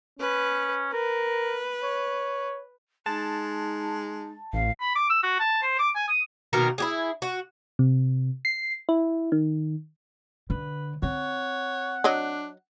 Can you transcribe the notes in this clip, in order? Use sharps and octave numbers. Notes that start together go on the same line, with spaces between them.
C#4 B4
A#4 B4
C#5
G#3 D#4 A5
A1 F5
B5
D6
E6
F#4
A5
C5
D6
G#5
D#6
B2 D#3 A#3 A#4
E4 G4 G#4
F#4
C3
C7
E4
D#3
D3 B4
C4 C#5 F#5
F#3 D4 C#5 D#5